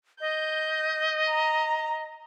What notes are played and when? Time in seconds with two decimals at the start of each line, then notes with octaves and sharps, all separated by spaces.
0.21 D#5 G6
1.29 A#5